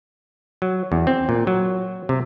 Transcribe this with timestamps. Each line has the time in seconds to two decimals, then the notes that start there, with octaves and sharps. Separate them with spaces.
0.62 F#3
0.92 E2
1.07 C4
1.29 A#2
1.47 F#3
2.09 C3